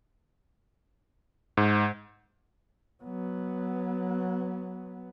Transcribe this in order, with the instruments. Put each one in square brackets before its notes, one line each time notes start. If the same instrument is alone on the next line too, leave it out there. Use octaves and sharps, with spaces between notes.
[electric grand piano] G#2
[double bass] F#3 B3